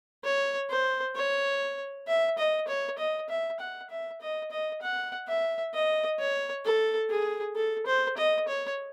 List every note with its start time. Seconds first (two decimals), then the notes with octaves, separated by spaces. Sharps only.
0.24 C#5
0.70 C5
1.16 C#5
2.08 E5
2.38 D#5
2.68 C#5
2.98 D#5
3.29 E5
3.60 F#5
3.90 E5
4.21 D#5
4.51 D#5
4.82 F#5
5.28 E5
5.73 D#5
6.19 C#5
6.65 A4
7.10 G#4
7.56 A4
7.86 C5
8.17 D#5
8.48 C#5